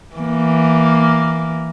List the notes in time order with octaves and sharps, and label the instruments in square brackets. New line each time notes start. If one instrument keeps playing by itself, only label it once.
[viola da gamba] E3 A#3